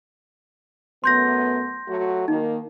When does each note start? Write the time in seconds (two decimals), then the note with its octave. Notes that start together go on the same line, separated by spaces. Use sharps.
1.04 F#2 A3 B3 C6 G6 A#6
1.88 F#3 A3 F#4
2.28 D#3 A#3 D#4